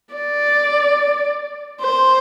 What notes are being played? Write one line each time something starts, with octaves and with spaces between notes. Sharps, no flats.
D5
C5